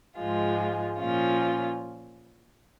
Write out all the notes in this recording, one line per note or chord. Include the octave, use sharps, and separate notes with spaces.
G#2 F3 G#3 F4
A#2 F3 C#4 F4